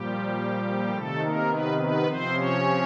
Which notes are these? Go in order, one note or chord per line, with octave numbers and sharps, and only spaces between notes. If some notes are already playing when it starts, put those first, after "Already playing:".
Already playing: A#2 F3 G3 G4
C3 D#3 A3 A4
A#3 A#4
B3 B4
B3 B4
C3 F3 C4 C5
C#4 C#5